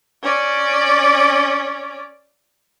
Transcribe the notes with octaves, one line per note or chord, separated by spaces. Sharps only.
C#4 D5